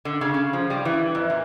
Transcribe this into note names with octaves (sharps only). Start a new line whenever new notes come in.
D3
C#3
C#3
F3
G3
E3
F2
A#2